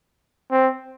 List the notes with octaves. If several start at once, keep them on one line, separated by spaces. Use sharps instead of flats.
C4